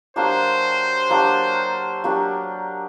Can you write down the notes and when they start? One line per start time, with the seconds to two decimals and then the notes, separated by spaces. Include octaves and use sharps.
0.16 F#3 A#3 D4 G4 C5
1.10 F#3 A#3 D4 G4
2.04 F#3 A#3 D4 G4